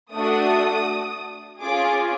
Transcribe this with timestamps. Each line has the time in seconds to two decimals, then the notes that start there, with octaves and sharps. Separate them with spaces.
0.14 A3 D4 F#4 A4 D#6
1.61 C#4 F4 G#4 D6